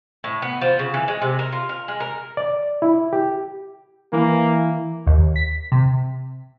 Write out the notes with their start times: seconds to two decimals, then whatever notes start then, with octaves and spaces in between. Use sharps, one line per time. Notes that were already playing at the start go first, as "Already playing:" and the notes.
0.24 A2
0.42 B3
0.61 F3
0.79 C#3
0.94 E3
1.08 G#3
1.22 C3
1.39 A#4
1.52 F4
1.69 A#4
1.88 G#3
2.00 A#4
2.37 D5
2.82 E4
3.13 G4
4.13 E3 A#3
5.07 D#2
5.36 B6
5.72 C3